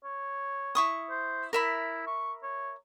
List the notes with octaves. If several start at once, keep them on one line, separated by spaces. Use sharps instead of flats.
C#5
E4 C#6 D#6
C5
E4 A#4 E5 B5
C#6
C#5